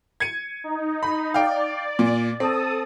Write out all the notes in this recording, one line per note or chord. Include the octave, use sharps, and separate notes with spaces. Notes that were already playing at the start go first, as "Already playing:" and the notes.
G#6 C#7 D#7
D#4
B5
D5 F5 G5
A#2
C4 A4 A5 D#6